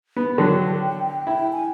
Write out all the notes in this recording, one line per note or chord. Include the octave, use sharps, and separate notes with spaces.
B3
D3 F#3 G5
E4 G5
G#5